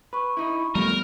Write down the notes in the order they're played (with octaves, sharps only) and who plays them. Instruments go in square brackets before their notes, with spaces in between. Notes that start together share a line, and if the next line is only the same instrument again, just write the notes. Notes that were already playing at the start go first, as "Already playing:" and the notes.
[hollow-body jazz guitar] B4 [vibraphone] B5 C#6
[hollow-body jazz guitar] D#4 E4
[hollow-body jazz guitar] F3 A3 [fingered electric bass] G3 B3 [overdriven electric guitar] A#4